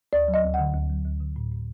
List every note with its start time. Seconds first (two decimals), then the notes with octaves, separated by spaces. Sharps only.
0.13 D2 D5
0.28 F#3
0.34 D#5
0.44 D2
0.54 F#5
0.59 D3
0.75 D2
0.90 F#3
1.05 D2
1.20 D3
1.36 A2
1.51 A2